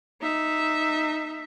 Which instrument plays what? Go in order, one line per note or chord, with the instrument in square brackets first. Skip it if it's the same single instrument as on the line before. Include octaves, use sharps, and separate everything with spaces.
[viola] D#4 E5